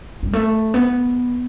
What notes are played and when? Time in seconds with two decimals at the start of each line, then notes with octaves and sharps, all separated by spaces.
0.23 G3
0.33 A3
0.74 B3